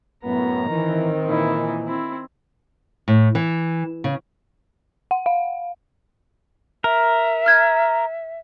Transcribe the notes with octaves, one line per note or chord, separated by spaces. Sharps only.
F#2 A2 B3 A#5
D#3 E3 C4
A#2 E3 D#4 E4
C4 E4
A2
E3
C#3
F#5
F5
A#4 E5
F6 G#6